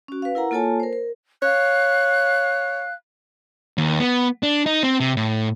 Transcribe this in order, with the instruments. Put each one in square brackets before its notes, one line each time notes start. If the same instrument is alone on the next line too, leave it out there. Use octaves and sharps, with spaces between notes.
[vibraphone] C#4 F#4
B4 F5
E4 A#4 F#5 A#5
A#3 F4 A4 C#5 G#5 A5
A#4 C5
A#4
[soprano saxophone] C#5 [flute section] F5 F#6
[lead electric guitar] D#2
B3
D4
D#4
C4
C3
A2